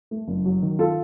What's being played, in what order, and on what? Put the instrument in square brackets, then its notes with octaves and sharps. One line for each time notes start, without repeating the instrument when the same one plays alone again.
[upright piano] A3
F#1
F#3
D#3
F4 A4